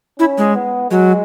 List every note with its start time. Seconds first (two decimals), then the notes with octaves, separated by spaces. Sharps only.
0.19 C#4 E4
0.38 G#3
0.55 B3
0.91 F#3 G#3